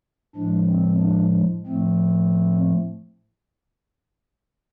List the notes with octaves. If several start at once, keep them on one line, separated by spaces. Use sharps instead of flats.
A2 F3 G#3 D4
C4
D4
A2 F3 A3 C4